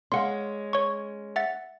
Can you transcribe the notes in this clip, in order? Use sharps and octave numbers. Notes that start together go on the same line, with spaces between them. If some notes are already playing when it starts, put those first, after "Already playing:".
G#3 C#4 F5 F#5 C6
C#5 C#6
E5 F#5 A6